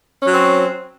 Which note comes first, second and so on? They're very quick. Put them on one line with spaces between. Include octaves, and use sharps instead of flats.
C#4 F#3 C4